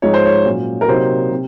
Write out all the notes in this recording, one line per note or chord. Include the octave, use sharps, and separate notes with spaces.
G#2 F3 G#3 D#4 C#5
C5
C#5
A#2 F#3 C#4
A#4
C3 F#3 A#3 D#4 C5
C3